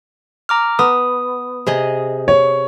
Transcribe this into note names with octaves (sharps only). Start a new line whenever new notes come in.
A#5 D6 F6
B3 D#6
C3 G#4 D#5
C#5